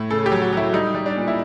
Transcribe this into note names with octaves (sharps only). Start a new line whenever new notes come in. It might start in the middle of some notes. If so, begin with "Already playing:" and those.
Already playing: A2
C#3 A4
G4
F#3
F#4
F#3 E4
G3 D#4
G3
D4
A#2
E4